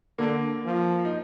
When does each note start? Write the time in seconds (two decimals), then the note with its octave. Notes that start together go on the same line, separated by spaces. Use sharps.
0.18 D3 A#3
0.65 F3
1.05 D#4